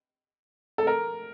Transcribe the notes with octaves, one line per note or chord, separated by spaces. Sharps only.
A4
A#4